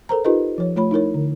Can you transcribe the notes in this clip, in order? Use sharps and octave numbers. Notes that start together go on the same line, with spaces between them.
A4 A#4 C5 A#5
D#4 F4 G4 A4 B4 D#5
F3 C#5
A3 F4 C#5 B5
D#4 E4 A#4 C#5
D3